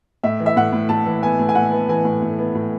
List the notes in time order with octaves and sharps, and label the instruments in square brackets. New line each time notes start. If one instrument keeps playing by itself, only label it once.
[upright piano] A2 E5
E3
E5
A2 F#5
A2
A2 A5
E3
B3 G#5
A2
G#5
A2 F#5
B3
E3 G#5
A2
A2
B3
A2